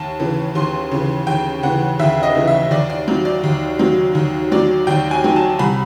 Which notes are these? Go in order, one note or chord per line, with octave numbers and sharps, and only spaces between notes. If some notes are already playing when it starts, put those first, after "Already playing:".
Already playing: D#2 A5
C#3 E3
D#2 C6
C#3 E3
D#2 G5
C#3 E3 F#5
D#2 E5
D#5
C#3 E3
E5
D#2 D5
D5
D#3 F#3
D5
D#2
D#3 F#3
D#2
D#3 F#3 D5
D#2 G5
G#5
D#3 F#3
A5
C2 B5